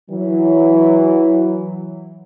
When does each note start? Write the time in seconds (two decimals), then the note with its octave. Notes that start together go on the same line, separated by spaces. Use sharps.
0.10 E3 F#3